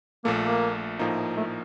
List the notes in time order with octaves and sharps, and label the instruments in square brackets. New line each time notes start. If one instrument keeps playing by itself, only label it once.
[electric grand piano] A#1 A#2 A3 [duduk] A#3
[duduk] A#3
[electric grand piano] A#1 A2 F3 A#3 D#4
[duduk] A3